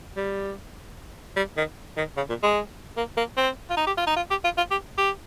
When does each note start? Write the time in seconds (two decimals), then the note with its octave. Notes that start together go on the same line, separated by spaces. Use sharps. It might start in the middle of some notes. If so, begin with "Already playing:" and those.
0.17 G3
1.37 G3
1.57 D#3
1.97 D#3
2.17 C#3
2.30 A#2
2.43 G#3
2.97 A#3
3.18 A#3
3.37 C4
3.70 F4
3.77 D#4
3.87 G4
3.98 F4
4.07 D#4
4.17 F4
4.31 G4
4.44 F4
4.57 F4
4.71 G4
4.98 G4